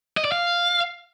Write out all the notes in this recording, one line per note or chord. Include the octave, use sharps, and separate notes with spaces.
D#5
D5
F5